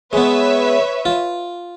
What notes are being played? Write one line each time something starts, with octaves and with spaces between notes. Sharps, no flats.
G#3 B3 B4 C#5 E5
F4